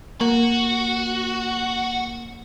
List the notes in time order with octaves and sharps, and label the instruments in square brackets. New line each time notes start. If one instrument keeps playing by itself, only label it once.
[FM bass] A#3 [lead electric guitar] F#4